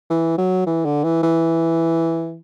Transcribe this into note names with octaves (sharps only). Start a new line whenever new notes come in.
E3
F#3
E3
D3
E3
E3